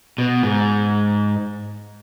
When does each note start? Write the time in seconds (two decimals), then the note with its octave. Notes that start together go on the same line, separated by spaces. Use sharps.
0.18 B2
0.43 G#2